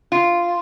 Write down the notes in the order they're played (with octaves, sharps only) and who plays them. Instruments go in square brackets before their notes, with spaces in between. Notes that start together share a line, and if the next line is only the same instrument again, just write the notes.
[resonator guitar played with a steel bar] F4